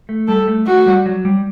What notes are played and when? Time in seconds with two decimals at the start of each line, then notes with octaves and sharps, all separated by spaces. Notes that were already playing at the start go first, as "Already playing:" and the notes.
0.09 A3
0.28 G3 A4
0.48 A3
0.67 A3 F#4
0.86 G3
1.06 F#3
1.25 G3